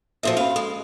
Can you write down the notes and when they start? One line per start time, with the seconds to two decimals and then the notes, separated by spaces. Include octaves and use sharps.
0.23 E2 A#2 F3 F#4 A4 E5
0.37 C#4 F#4 F5 B5
0.56 G#3 A4